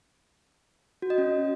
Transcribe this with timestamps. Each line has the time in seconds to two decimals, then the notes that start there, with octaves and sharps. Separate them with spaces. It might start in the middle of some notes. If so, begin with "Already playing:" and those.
1.02 F#4
1.10 D#5
1.18 C#4